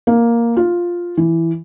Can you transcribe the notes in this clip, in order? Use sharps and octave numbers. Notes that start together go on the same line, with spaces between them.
A#3
F4
E3